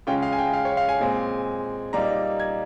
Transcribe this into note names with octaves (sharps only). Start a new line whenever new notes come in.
C#3 G#3 C#4 F4 G5
F5
G#5
G5
F5
C#5
F5
G#5
A#2 G#3 C4
A#2 G3 A#3 D#4 A#5
G#6